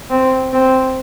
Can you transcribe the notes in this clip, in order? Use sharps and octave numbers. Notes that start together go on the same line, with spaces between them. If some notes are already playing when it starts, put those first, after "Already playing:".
C4
C4